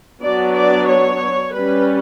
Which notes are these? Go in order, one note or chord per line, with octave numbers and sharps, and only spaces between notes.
F#3 B3 D4 D5
D5
C#5
G3 C#4 B4